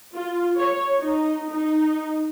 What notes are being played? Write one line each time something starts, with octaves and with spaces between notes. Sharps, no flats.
F4
C#5
D#4
D#4